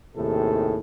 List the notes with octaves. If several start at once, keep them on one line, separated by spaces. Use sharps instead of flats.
D#2 A2 C3 D#3 G#4 A4